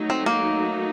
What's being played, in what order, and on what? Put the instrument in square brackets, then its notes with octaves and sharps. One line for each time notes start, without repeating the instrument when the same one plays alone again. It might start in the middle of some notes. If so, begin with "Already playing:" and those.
Already playing: [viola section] F#3 A3 D#4
[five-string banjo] C4
A#3